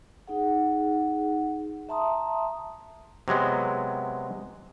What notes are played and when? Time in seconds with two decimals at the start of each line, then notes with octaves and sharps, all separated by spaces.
0.28 D#4 G#4 F#5
1.89 E5 A5 A#5 C6 D#6
3.28 C3 F#3 G#3 B3